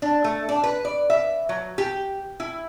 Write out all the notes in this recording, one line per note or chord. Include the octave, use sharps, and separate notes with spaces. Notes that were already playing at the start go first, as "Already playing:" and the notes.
D4
A3
D4
B4
D5
E5
F#3
G4
E4